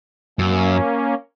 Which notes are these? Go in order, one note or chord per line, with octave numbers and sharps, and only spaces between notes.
F#2 A#3 C#4